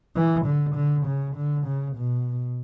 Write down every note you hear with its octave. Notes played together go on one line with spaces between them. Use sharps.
E3
D3
D3
C#3
D3
C#3
B2